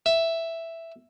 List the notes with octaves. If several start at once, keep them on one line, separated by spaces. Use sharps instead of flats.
E5